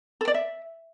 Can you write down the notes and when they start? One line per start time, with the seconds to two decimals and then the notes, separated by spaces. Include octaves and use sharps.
0.21 A4
0.28 D5
0.34 E5